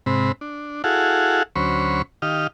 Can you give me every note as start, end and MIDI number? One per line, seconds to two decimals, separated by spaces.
0.06 0.32 44
0.06 0.32 48
0.06 0.32 60
0.06 0.32 83
0.41 0.82 62
0.84 1.43 64
0.84 1.43 66
0.84 1.43 68
0.84 1.43 69
0.84 1.43 77
0.84 1.43 78
1.56 2.02 38
1.56 2.02 54
1.56 2.02 61
1.56 2.02 72
1.56 2.02 83
1.56 2.02 85
2.22 2.47 51
2.22 2.47 67
2.22 2.47 75
2.22 2.47 77
2.22 2.47 89